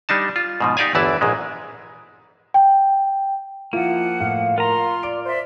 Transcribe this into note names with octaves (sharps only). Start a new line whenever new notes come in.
G3 D4 D#4 A5
F4
G#2 B2 F3
D#4 G4 D5 F5 G#5
G1 E2 E3 E4 D5 A5
A#1 G#2 G#3
G5
F3 A#3 E4 F4 F#5
A2 F5
F4 A#4 A#5 C6
D5 D7
C5 D5 E5 C6